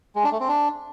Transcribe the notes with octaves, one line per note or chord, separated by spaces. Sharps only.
G#3
D4
A3
C4
D4